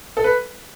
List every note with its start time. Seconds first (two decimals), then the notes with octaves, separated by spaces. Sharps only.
0.17 A4
0.24 B4